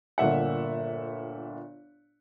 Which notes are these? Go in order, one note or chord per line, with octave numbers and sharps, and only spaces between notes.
G1 A#2 E5 F#5